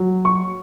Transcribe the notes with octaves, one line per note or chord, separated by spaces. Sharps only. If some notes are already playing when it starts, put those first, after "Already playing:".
Already playing: F#3
C#6